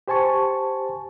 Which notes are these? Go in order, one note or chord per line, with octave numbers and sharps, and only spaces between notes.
G4 C5 G#5 A5 C#6